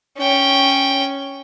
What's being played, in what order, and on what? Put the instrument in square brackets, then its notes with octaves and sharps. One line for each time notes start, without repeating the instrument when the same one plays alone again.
[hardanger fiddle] C#4 G5